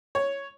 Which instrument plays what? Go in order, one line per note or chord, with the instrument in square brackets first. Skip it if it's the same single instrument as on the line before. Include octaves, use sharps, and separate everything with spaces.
[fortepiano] C#5